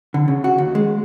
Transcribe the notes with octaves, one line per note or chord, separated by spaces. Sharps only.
D3
C#3
F#4
D#2
G#3